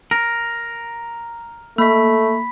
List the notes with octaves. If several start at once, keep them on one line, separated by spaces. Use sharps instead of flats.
A#4
A3 A#3 B5 B6